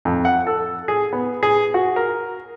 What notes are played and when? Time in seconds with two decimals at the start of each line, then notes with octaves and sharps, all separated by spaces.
0.05 F2
0.25 F#5
0.47 A4
0.88 G#4
1.13 B3
1.43 G#4
1.74 F#4
1.96 A#4